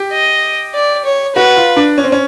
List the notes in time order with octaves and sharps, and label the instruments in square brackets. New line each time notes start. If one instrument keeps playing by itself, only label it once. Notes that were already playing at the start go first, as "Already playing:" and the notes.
Already playing: [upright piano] G4
[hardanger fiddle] D#5
D5
C#5
[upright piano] F#4 [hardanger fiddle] B4
[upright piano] F4
D4
C#4
C4
C#4